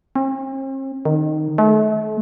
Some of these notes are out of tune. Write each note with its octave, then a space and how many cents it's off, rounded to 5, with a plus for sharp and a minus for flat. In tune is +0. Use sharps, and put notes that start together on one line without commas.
C4 +45
D#3 -15
A3 -40